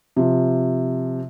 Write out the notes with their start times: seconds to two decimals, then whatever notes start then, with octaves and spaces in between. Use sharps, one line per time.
0.16 C3 F3